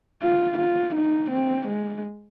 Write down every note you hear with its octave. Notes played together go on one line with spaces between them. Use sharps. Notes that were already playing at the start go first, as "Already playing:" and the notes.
F4
F4
D#4
C4
G#3